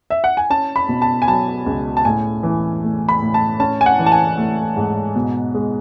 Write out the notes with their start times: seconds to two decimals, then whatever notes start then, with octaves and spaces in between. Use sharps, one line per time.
0.10 E5
0.24 F#5
0.37 G#5
0.50 C#4 A5
0.76 B5
0.88 B2
1.02 A5
1.22 G#5
1.28 F#3 A5
1.66 C#2
1.97 A5
2.05 A2 G#5
2.43 E3
2.83 A3
3.09 B5
3.21 A2
3.34 A5
3.59 C#4 A5
3.81 G#5
3.86 F#5
3.99 E3
4.06 A5
4.12 G#5
4.38 A3
4.76 G#2
5.15 B2
5.54 G#3